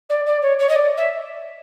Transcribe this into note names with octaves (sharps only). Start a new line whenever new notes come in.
D5
D5
C#5
C#5
D#5
D5
E5